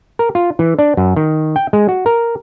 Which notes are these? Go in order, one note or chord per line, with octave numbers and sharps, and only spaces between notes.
A#4
F4
E3
D4
F#2
D#3
G5
G#3
F#4
A#4